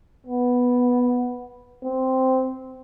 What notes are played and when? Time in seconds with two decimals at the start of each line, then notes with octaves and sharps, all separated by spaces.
0.26 B3
1.84 C4